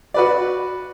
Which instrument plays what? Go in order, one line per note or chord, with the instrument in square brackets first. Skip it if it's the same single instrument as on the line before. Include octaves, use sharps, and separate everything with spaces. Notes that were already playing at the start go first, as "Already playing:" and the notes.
[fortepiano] F#4 B4 D5